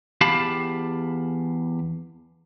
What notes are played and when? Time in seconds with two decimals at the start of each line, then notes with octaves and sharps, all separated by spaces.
0.21 E2 G4 F5 A5 B5